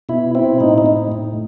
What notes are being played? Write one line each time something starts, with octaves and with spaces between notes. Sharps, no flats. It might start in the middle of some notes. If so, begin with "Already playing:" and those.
B2 E4
C4 E4
A2 D#4
D#4
A2
A2